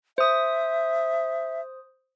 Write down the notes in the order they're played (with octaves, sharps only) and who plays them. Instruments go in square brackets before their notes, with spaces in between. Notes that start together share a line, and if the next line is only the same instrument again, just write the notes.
[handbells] C5 D#6 [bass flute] E5